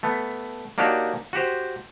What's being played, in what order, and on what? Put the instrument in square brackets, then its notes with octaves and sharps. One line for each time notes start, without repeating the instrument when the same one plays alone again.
[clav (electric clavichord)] A3 B3
A#3 D4 D#4 F#4 G4 C#5
F#4 G4 C5